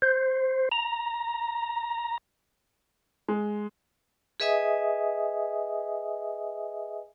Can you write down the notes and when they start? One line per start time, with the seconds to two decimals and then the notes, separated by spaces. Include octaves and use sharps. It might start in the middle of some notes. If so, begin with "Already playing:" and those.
0.02 C5
0.72 A#5
3.28 G#3
4.40 G#4 B4 D#5 E5 G#5 D#6